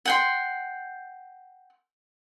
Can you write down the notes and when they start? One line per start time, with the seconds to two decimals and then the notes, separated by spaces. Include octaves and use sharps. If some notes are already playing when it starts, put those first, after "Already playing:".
0.05 F#5 G5 C6